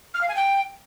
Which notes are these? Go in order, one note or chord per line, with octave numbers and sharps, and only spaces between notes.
F6
F5
G#5
G5